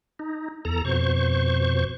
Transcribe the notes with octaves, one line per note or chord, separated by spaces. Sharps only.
D#4
E2 A4 A#5
F2 B2 C5 C#6